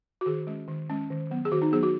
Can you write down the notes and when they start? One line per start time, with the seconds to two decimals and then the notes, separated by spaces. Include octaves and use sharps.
0.21 F#4
0.26 D#3 G#4
0.47 G#3 C#4
0.68 D#3
0.89 G#3 C#4
1.10 D#3
1.30 F#3 B3
1.45 G#4
1.52 D#3 F#4
1.62 D#4
1.72 F#3 B3 G#4
1.83 F#4